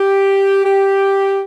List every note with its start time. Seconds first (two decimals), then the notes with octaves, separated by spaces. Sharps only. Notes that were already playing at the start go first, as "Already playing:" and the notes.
Already playing: G4
0.65 G4